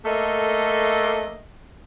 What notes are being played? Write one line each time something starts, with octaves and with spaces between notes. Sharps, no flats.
A3 A#3 A4 D#5 E5